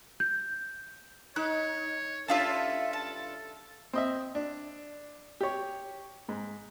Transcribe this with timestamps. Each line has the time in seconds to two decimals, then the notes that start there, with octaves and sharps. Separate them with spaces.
0.20 G6
1.36 D#4 C#5 F#6
2.28 G2 C#4 F4 A4 E5 F5 A5
2.93 A5
3.93 C4 D#5 E5
4.35 D4
5.41 G4 C#5
6.29 G#2